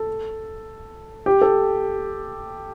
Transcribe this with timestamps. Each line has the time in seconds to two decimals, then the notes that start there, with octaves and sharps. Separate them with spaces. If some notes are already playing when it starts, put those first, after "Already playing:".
Already playing: A4
1.26 G4
1.41 A4